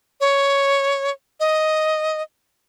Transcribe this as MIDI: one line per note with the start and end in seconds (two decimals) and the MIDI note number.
0.21 1.11 73
1.40 2.22 75